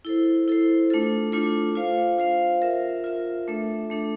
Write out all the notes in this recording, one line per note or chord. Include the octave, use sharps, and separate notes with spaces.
E4 A4 C5
E4 A4 C5
A3 D4 F4 A4
A3 D4 F4 A4
F4 C5 F5
F4 C5 F5
F4 A#4 E5
F4 A#4 E5
A3 D4 A4 E5
A3 D4 A4 E5